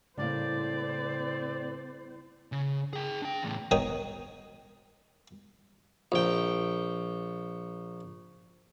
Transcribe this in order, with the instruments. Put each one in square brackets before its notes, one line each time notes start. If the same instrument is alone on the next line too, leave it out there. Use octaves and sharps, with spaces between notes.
[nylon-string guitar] A2 A#3 [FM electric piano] C#3 G3 E4 [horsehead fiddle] C4 C5 [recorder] D5
[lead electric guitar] C#3
G#4 G5
D4 G5
E2 A2
[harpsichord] B2 D#3 C#5 G5 A#5 D#6
A#1 G5